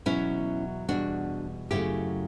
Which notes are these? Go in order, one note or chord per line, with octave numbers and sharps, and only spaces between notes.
E2 B2 F#3 C#4 E4
E2 B2 G3 D4 F#4
F#2 C#3 F#3 A3 E4 G4